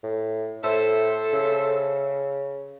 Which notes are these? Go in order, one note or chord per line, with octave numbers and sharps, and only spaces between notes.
A2
A2 A4 C5 E5
C#3